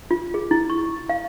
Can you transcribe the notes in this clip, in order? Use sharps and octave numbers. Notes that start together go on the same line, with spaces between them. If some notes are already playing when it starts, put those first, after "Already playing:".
F4
G#4
E4
C#6
F5